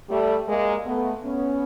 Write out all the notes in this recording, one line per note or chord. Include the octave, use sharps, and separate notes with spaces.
G3 A3
G#3 A#3
A3 B3
B3 C#4